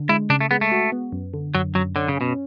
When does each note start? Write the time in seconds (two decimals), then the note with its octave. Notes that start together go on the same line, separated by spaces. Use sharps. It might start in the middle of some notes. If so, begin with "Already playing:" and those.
Already playing: D3 D4
0.09 G#3 E4
0.30 C#3 D4
0.41 A3
0.51 G#3 B3
0.61 A3
0.72 F#4
0.92 B3
1.12 F#2
1.34 D3
1.55 F#2 F#3
1.75 F#2 F#3
1.96 D3 C#4
2.08 C#3
2.17 B2 C#4